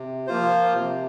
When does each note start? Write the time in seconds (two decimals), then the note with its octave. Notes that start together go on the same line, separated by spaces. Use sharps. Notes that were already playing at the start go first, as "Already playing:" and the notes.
Already playing: C3
0.27 F3 A#3 F4 C5
0.74 C3